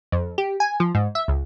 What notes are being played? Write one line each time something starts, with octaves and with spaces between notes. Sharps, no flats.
F2
G4
G#5
F3
G#2
E5
C#2